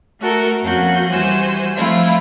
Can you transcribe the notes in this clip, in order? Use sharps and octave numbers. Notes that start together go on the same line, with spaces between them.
A3 F#4 A4 A#4
F2 A#3 C#4 F#4 G6
E3 G3 F#4 C5 G#5 E6
F3 A3 C4 E4 F4